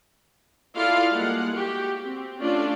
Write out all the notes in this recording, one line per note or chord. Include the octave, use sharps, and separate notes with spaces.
E4 F4 A4 D5 F5
G3 G#3 A#3 F#5
F#4 G4
C4
A3 C#4 D4 F4 D5